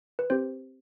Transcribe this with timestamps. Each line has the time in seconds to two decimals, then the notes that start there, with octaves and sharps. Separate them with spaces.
0.19 B4
0.30 C4 G4 C5